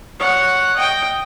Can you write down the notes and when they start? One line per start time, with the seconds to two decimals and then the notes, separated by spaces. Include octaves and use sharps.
0.20 C#5 F#5
0.77 D#5 G5